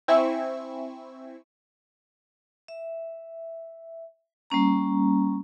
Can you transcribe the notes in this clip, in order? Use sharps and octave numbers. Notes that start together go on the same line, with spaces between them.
C4 E4 E5 G#5 C#6 E6
E5
G3 A#3 C#4 A#5